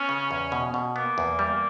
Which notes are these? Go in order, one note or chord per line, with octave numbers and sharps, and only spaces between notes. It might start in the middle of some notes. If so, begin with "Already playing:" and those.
Already playing: B3 C#4
C#3
E2
B2
B2
A#3 B3
E2
G3